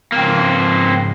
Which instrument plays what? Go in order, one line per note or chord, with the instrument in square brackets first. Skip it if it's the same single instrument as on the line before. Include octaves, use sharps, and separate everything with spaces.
[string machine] G#2 C#3 F3 [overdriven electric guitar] A#3 C4